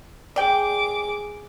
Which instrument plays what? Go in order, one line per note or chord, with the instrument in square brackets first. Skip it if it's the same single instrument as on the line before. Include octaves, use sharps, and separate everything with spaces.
[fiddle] G#4 D6 [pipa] D5 G5